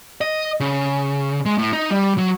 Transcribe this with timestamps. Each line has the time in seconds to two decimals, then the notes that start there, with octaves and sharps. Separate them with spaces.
0.21 D#5
0.60 C#3
1.46 G#3
1.58 A2
1.73 D#4
1.91 G3
2.18 F#3